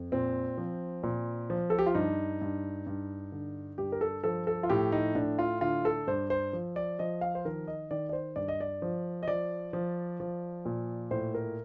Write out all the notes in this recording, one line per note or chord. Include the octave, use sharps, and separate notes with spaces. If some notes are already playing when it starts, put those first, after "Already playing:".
Already playing: F2
A#2 C4
F3
A#2
F3
A4
G4
F4
G2 D#4
G2
G2
D3
G2 G4
A#4
A4
F3 A4
A4
F4
A2 G4
D#4
A2 D4
F4
D3 F4
A4
G2 C5
C5
F3
D5
F3 D#5
F5
C5
D#3 A#4
D#5
D#3 D5
D5
C5
G2 D5
D#5
D5
F3
D#5
F3 D5
F3
F3
A#2
A2 C5
A#4